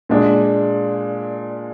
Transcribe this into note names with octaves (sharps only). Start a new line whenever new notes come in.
A#2 G#3 D4